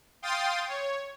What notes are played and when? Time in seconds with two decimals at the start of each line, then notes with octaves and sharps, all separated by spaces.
0.22 F5 G5 C6 D#6 A6
0.67 C#5